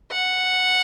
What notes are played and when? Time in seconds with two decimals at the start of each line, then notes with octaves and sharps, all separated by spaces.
0.12 F#5